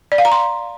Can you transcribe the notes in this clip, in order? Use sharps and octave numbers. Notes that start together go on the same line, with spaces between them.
D5
F5
A#5
C6